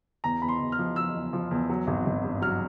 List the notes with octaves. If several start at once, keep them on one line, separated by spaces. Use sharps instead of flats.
E2 A#5
E2 B5
C6
E2
F6
F3
F3 E6
E2
F3
E2
F#3
G#1
G#1
G2
F#3 F6